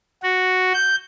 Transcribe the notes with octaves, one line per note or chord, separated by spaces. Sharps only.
F#4
G6